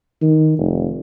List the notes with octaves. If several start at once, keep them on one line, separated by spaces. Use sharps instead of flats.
D#3
F1